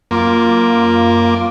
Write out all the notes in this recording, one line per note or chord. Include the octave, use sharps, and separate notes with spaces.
F#2 A#3 F4 D6